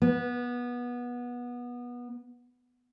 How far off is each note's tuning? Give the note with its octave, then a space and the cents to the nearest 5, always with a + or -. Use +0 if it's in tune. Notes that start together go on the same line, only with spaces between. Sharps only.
B3 -20